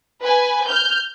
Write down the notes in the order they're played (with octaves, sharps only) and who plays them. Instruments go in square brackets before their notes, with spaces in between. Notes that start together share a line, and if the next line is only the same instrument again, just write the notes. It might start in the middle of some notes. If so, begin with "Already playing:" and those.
[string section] B4 G#5
F6 G6